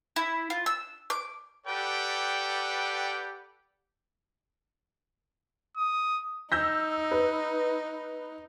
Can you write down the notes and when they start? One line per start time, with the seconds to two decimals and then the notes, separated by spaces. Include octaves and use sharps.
0.16 E4
0.50 F4
0.66 E6
1.10 D6
1.67 G4 A4 B4 D5 F#5 G5
5.77 D#6
6.52 D#4 E6 G6 A#6
7.11 B4